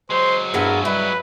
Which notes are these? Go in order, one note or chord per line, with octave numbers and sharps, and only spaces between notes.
F#3 G#3 C5 C6
G2 B3 E4 G#4 A#4
G3 E4 B4